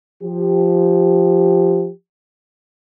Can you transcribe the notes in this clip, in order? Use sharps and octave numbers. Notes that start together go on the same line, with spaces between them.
F3 G4